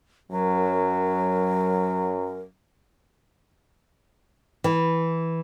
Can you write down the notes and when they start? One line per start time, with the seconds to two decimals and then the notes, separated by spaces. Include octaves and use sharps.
0.32 F#2 F#3 A#4
4.64 E3